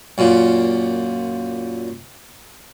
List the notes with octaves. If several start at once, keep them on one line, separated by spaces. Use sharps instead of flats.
F#2 A#2